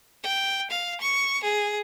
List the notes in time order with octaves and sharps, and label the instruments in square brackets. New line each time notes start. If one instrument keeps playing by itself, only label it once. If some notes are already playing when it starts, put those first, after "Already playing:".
[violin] G5
F5
C#6
G#4